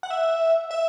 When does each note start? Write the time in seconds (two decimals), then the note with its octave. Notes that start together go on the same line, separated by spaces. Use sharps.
0.03 F#5
0.10 E5
0.71 E5